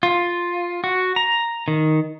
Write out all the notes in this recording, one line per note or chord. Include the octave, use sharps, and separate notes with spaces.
F4
F#4
A#5
D#3